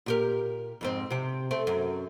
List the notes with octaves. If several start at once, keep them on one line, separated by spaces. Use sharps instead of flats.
A#2 G4 A#4
F2 G#2 C4
C3 G4
A3 C4
F#2